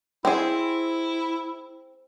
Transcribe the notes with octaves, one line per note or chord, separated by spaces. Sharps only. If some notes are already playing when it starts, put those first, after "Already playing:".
C4 E4 G#4